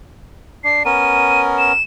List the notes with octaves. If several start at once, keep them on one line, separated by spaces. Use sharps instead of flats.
D4 C7
B3 C#4 A#4 D#7
E7